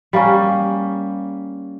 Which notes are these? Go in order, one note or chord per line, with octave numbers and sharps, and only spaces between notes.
G3 A#3 C#4